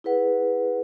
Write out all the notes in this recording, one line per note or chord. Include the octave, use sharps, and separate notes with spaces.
E4 G#4 B4 F#5